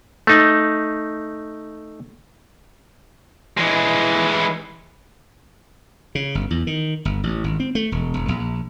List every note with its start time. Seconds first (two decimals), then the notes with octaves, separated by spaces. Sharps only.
0.27 A3 D#4
3.57 E3 G#3
6.15 C#3
6.35 G1
6.51 E2
6.67 D#3
7.05 G1
7.23 A1
7.44 G#1
7.60 C4
7.75 A3
7.92 E1
8.14 E1
8.28 A#1